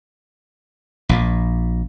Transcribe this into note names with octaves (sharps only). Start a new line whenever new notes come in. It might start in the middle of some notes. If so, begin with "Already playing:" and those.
A#1 A#2